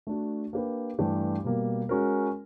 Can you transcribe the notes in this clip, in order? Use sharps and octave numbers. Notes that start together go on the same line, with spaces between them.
A3 D4 F#4
A#3 D4 G4 B4
G2 E3 A3 D4 G4
B2 G3 A#3
G#3 C#4 F#4 A#4